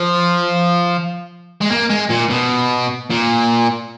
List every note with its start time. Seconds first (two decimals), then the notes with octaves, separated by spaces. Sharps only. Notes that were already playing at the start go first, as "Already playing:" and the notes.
Already playing: F3
1.61 G#3
1.71 A#3
1.90 G#3
2.10 A#2
2.31 B2
3.10 A#2